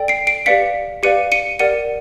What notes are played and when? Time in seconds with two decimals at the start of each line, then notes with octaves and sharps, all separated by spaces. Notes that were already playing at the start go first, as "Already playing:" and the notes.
Already playing: A4 D5 G5
0.08 C7 D7
0.27 C7 D7
0.46 G4 B4 D5 F5 B6 C#7
1.03 G4 B4 D5 F5 C#7 D#7
1.32 C#7 D#7
1.59 G4 A#4 D5 F#5 C#7 D#7